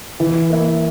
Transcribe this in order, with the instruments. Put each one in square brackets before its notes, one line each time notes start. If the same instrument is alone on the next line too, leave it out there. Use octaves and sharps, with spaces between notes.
[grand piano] E3
A#3 E4